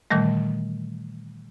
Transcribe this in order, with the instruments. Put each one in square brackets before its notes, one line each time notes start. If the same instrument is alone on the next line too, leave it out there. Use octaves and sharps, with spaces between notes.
[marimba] A#2 D#3 E3 G3 A3